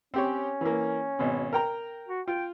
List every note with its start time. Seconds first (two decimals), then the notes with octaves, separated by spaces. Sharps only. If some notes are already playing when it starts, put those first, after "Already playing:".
0.14 C4 C#4 G4 C#5
0.61 E3 A#3
1.19 G#1 B2
1.53 A#4 G5 A#5
2.08 F#4
2.28 F4 G5